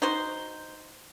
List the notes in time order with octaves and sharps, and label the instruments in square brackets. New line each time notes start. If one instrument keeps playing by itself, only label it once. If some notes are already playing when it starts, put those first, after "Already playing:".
[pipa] D#4 F#4 C5